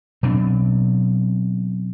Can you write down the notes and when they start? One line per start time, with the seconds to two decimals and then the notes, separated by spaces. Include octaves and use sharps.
0.23 B2 F#3 C4 D4